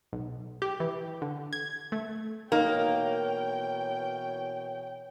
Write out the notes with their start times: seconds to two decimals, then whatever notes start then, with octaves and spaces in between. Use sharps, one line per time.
0.13 B1
0.62 G4
0.80 E3
1.22 D3
1.53 G#6
1.92 A3
2.52 B2 E3 A#3 D#4 A#4 C#5 G5